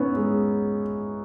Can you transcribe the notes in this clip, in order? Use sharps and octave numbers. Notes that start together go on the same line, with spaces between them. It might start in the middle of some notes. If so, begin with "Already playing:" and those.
Already playing: B3 C#4 D#4 E4
G#3